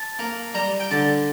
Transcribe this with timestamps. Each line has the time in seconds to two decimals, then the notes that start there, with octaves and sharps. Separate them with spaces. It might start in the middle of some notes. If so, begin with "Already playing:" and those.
Already playing: A5
0.19 A#3
0.54 G3 A#5
0.80 G5
0.91 D3 A5